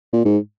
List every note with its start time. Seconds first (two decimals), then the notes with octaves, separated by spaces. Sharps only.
0.13 A#2
0.25 G#2